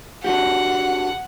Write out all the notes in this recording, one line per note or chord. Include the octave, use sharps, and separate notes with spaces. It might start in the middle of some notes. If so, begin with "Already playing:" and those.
D4 F#4 G4 F#5